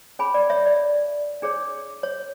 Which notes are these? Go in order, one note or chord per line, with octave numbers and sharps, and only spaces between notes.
C#4 G#4 C#5 G#5 B5
D5
C#5 E5
D5
D4 G#4 C#5
C#5